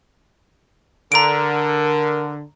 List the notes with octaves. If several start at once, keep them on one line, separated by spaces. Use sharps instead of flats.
D3 A#4 A#5 D7